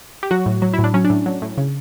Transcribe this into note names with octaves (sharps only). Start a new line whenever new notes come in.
G4
F#3 F#4
A2
F#3
E4
A2
D4
F#3 C#4
D4
A2
F#3
A2
C#3